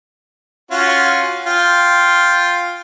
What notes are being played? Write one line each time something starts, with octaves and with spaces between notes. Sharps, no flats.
C#4 F4 F#4
F4 G5